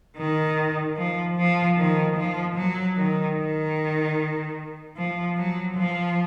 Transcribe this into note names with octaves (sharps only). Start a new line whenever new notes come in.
D#3
F3
F3
D#3
F3
F#3
D#3
D#3
F3
F#3
F3